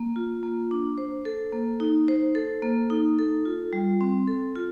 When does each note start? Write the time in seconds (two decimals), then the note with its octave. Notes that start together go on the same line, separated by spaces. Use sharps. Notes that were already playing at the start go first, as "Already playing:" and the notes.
Already playing: A#3
0.16 F4
0.43 A#3
0.71 D4
0.98 C5
1.25 A4
1.53 A#3
1.80 D#4
2.08 C5
2.35 A4
2.62 A#3
2.90 D#4
3.19 A4
3.45 F4
3.73 G3
4.01 C4
4.28 A4
4.55 F4